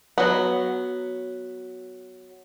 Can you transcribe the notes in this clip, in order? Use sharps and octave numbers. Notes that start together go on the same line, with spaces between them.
F#3 B3